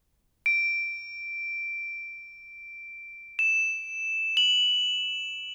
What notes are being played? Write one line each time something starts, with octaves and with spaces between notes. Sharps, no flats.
D7
E7
F#7